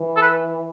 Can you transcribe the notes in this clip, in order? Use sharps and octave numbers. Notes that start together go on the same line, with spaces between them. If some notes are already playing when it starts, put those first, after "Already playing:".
Already playing: E3
A4
B4